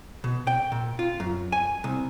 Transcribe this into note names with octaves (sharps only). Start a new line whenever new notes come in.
B2
G5
A#2
F4
F#2
G#5
C2